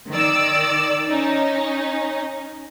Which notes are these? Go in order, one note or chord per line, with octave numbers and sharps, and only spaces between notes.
D#3 D5 E6
C#4 D#4